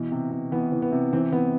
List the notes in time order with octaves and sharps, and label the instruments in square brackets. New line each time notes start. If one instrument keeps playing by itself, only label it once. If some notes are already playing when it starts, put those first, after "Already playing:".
Already playing: [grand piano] B2 E3
C3
C3
E3 B3
E3
B3
C3
E3 C4
E3 B3